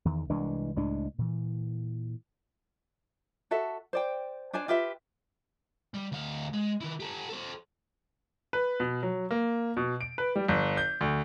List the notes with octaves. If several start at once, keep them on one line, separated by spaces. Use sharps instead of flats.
E2 D#3
C2 E3 G#3 D4
C#2 A2 G#3 D4
A#2 E3
F#4 A4 E5
C5 D5 G5
D4 C5 D5 G#5
F4 G4 B4 E5
G3
D2 F5
G#3
D#3 E4
G4 A4
A4 C5
B4
B2
F#3
A#3
B2
D7
B4
G3
G1
G6
D2